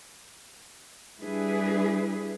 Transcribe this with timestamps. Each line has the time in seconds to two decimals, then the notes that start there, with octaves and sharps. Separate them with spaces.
1.18 G3 D4 E4 G#4 B4